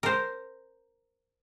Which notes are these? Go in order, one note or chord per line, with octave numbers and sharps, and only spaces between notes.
A#4 C5